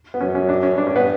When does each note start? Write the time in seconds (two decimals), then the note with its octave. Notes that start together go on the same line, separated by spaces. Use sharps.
0.14 B3
0.21 F#2 C#4
0.35 C#4
0.49 D4
0.63 C#4
0.78 G2 D4
0.87 C#4
0.96 B3